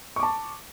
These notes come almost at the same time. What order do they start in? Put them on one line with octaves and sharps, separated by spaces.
C#6 D6 A5